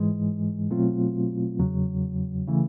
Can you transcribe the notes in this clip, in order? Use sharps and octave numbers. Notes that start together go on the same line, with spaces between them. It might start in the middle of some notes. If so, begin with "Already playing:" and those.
Already playing: G#2 E3 G#3
B2 F#3 A3 C4 F4
E2 C#3 F#3
C#3 E3 A3